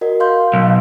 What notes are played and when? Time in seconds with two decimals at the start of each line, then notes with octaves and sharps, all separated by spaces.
0.01 F#4 A#4 D#5
0.20 F5 C6 G6
0.53 B1